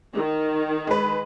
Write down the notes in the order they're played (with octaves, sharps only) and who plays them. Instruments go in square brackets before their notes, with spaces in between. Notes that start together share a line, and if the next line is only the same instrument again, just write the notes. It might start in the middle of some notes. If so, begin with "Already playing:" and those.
[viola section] D#3
[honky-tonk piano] G#3 B4